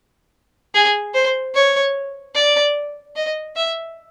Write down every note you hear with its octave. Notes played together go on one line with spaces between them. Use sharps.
G#4
C5
C#5
D5
D#5
E5